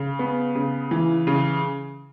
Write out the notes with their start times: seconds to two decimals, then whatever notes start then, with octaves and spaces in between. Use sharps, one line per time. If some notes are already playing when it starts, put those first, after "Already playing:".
Already playing: C#3
0.19 B3
0.55 C#3
0.91 E3
1.27 C#3